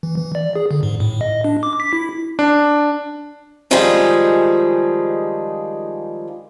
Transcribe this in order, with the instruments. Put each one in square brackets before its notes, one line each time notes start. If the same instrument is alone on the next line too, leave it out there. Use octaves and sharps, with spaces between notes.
[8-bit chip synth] E3
E3
D5
G#4
D3
G#2
A2
D#5
D4
D6
B6
E4
[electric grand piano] D4
[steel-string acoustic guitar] D#3 F3 G3 G#3 D#4 G#4